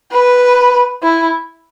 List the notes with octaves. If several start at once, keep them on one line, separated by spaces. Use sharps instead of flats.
B4
E4